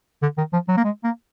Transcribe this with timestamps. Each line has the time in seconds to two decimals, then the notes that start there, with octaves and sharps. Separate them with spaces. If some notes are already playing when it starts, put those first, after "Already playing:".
0.23 D3
0.38 D#3
0.53 F3
0.68 F#3
0.77 A#3
0.84 G#3
1.04 A#3